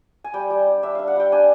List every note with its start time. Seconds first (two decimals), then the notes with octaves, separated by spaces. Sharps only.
0.24 G#5
0.34 G3 G5
0.50 G3
0.66 D4
0.83 D4 E5
0.95 D4 F5
1.08 F#5
1.16 G3 G5
1.32 D4 G#5